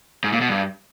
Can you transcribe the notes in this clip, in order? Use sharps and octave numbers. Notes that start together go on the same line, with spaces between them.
G#2
A#2
B2
G2